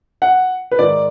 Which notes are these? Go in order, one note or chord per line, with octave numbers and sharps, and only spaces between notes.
F#5
B4
G#2 D#3 D5